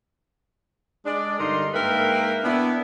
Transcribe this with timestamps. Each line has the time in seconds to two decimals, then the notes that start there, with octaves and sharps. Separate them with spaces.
1.06 G#3 D4 D5
1.39 G2 D3 D#4 A#4 C6
1.74 G#2 A#3 A#4 B4 E5 G5
2.44 B3 D4 E4